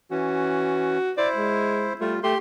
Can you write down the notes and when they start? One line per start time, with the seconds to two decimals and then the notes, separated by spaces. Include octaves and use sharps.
0.11 E3 C#4 F#4
1.17 E4 C5 D5
1.35 G#3
2.01 G3 A3 F4
2.23 A3 G4 C6